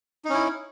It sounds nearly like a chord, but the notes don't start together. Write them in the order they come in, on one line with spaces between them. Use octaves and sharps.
D#4 C#4 E4